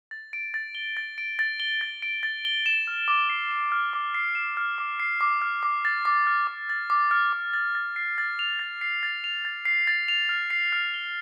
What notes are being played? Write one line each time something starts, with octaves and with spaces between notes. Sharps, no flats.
A6
D7
A6
G7
A6
D7
A6
G7
A6
D7
A6
G7
E7
F6
D6
C7
E7
F6
D6
C7
E7
F6
D6
C7
D6
F6
D6
A6
D6
F6
D6
A6
D6
F6
D6
A6
A6
C7
A6
F7
A6
C7
A6
F7
A6
C7
A6
F7
F6
C7
F6
G7